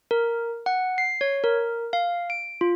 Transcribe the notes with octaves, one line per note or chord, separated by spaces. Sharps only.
A#4
F#5
C7
C#5
A#4
F5
D7
F4